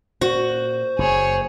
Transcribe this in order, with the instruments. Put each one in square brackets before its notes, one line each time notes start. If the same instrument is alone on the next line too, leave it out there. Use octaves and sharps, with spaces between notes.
[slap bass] A#2 [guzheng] F#4 [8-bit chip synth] C5
[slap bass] F#1 [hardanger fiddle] G#4 C#5